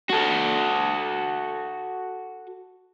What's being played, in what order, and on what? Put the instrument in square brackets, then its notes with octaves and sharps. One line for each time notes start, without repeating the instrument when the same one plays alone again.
[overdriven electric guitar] F#4 A4